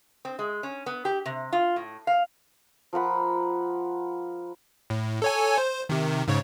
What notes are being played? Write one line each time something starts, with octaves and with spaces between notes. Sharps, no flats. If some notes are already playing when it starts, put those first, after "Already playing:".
C4
G#3
C#4
B3
G4
C3
F4
A2
F5
F3 A#4 F#5 B5
A2
A4 C#5 G#5
C5
C3 D#3
G#2 C#3 C#5